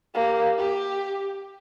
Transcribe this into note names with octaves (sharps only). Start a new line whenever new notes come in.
A#3 G4
G4